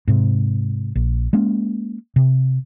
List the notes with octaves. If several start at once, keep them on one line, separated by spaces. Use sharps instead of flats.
G#2 C3
A#1
G#3 A#3 C#4
C3